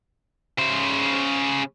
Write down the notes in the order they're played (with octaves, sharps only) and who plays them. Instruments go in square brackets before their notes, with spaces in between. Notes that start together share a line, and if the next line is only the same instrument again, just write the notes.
[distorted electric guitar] C#3 C5